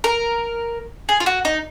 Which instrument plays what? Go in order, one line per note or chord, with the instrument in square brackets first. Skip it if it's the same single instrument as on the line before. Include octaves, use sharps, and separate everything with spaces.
[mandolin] A#4
G#4
F4
F#4
D#4